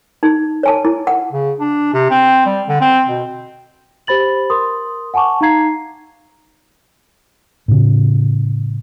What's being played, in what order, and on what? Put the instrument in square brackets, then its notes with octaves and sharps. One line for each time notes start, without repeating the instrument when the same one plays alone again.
[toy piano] D#4
C#5 G#5 A5
E4
F#5
[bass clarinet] C#3
D4
C3
C4
G3
D3
C4
B2
[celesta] G4 C5 B5 A6 F#7
A#4 C6 D#6
F#5 G#5 A5 C#6 D6
D#4 F5 A#5 G#6 C7
[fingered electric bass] A2 C#3